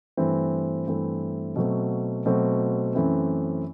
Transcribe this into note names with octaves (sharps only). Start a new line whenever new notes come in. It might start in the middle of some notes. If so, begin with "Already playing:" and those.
G2 E3 A3 C4
G2 E3 A3 C4
B2 F#3 A3 C4
B2 F#3 A3 C4
F#2 E3 A3 C4